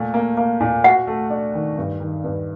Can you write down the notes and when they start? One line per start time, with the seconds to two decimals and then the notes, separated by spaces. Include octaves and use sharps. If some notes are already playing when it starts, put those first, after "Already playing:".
Already playing: A#2 A3
0.14 A#3
0.37 A#3
0.61 A#2
0.84 F#4 F#5
1.07 A3
1.30 D4
1.54 D#3
1.78 G2
2.00 D#3
2.24 G2